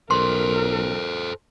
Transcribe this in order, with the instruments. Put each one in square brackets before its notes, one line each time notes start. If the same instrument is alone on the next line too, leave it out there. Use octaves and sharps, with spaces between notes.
[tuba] B1 [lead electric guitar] A4 C5 [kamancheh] A#4 [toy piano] C6